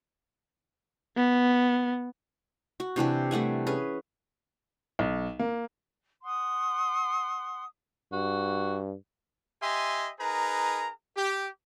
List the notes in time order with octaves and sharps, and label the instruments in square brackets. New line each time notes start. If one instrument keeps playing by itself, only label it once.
[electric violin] B3
[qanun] F#4
C3 E3 D4 G4
G3 A3 F#5 G#5
C#4 G#4 B4
[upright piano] B1
A#3
[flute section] F#5 C6 D#6
[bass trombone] G2 [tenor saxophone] F#4
[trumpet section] G4 D#5 E5 G#5 C6
D#4 G#4 A#4 B4 A#5
G4